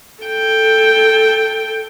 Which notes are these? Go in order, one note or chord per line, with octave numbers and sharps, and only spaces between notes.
A4 G5